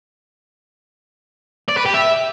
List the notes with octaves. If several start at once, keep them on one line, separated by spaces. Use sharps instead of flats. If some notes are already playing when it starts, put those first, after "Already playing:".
D5
B4
G4
E5